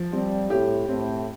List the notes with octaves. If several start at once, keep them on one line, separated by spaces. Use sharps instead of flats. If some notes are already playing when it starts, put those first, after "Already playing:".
Already playing: F3
G3 C4
A2 G4
A2 C4